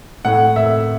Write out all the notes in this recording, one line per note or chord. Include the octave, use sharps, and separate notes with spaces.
A2 F#5
A2 E5